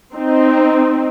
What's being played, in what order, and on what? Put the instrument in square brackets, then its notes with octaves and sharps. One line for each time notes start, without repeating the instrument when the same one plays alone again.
[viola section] C4 D#4